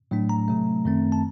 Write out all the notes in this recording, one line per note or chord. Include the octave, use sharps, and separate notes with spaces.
A2 F#3 A3 D4
A#5
C3 F#3 A3
F#2 D#3 A3 C4
A5